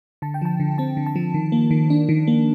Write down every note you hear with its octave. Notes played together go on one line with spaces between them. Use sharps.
D3 A5
G5
F3 A5
D3
C4 A5
D3
A5
F3
D#3
A#3
D#3
D4
D#3
A#3